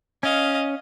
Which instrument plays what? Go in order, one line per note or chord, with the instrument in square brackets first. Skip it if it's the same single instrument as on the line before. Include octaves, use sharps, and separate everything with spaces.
[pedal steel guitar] C#4 [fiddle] D#5 F5